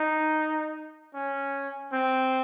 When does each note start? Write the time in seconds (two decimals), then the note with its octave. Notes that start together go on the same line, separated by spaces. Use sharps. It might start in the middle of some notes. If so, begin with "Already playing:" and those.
Already playing: D#4
1.15 C#4
1.93 C4